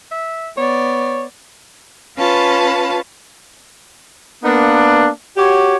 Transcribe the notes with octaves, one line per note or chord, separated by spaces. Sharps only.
E5
B3 C#5 D5
C#4 F4 B4 F5 A5 B5
A#3 B3 D4
F#4 G4 C#5